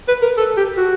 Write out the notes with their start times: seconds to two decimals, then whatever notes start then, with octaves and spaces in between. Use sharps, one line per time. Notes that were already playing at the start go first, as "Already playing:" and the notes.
0.08 B4
0.22 A#4
0.38 A4
0.57 G4
0.77 F#4